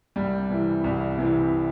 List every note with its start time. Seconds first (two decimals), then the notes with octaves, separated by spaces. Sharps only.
0.16 C2 G3
0.50 C3 E3
0.84 C2
1.18 C3 E3